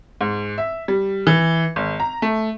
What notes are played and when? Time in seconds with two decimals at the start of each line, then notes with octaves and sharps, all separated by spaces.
0.21 G#2
0.58 E5
0.88 G3
1.27 E3
1.76 G#1
2.00 A#5
2.22 A3